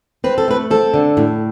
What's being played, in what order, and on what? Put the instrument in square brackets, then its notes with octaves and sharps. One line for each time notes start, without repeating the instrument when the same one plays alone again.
[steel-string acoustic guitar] C4 B4
A4
A3 B4
C4 A4
D3
A2